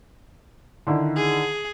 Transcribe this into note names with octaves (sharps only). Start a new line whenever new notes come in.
D3 D#3 E4
G#4